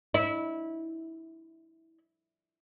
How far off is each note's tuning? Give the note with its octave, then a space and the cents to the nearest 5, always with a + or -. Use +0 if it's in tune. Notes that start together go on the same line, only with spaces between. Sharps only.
E4 -20